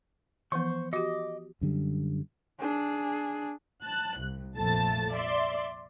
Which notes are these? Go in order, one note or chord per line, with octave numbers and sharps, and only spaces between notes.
E3 F3 B3 C5 C#6
F#4 G4 D#5 D6
F#2 D3 G3
D4 G#4
A5 F#6
C2
A#1 F2 F3 A3 A5 A6
D5 E5 C6